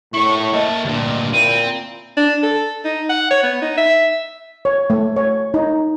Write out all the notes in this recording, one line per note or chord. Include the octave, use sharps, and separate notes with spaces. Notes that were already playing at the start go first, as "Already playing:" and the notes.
A2 E4 C#5 C#6
A#3 D#5 E5 A5
D2 G2 A#2
A#2 C4 E4 D#7
D4
A4
D#4
F#5
C#5
B3
D#4
E5
C#5
A3
C#5
D#4